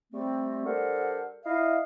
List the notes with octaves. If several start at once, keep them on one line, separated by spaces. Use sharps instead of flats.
G3 A3 C4
G3 D4 A4 A#4 C5 F#5
E4 D#5 F5